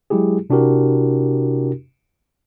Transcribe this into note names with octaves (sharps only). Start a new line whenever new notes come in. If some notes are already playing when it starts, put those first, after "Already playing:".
F#3 G#3 E4 G4 G#4
C3 D4 E4 F#4 G4 A#4